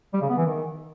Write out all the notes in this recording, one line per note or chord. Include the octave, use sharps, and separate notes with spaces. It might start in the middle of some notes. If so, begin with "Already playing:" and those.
G3
C#3
B3
E3
D#3